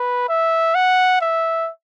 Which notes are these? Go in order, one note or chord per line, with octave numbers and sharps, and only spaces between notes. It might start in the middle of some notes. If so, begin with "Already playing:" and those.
Already playing: B4
E5
F#5
E5